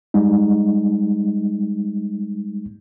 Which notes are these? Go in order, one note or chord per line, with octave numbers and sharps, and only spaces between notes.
G3 G#3 D#4